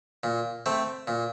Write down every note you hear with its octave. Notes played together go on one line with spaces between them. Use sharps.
A#2
A3 C4
A#2